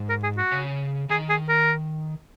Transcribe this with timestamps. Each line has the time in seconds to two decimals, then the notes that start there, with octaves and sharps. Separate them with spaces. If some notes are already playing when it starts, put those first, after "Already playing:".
Already playing: G#2
0.09 A#4
0.23 G#4
0.37 F#4
0.52 C#3
1.10 D#3 G#4
1.29 G#4
1.48 A#4